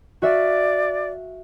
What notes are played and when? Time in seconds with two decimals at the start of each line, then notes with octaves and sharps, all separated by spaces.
0.22 F#4 D5 E5 F5